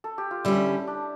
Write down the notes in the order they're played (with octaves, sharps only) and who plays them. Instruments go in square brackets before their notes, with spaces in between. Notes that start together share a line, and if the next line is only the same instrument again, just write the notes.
[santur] A4
G4
F4
[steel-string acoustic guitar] D3 G3 C#4 [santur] E4
[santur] D4